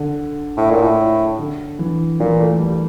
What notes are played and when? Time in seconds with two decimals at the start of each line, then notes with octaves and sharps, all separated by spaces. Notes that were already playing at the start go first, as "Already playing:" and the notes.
Already playing: D3
0.57 A2
0.70 A#2
0.83 A2
1.39 D3
1.79 E3
2.20 A#2 E3
2.40 A3
2.60 G3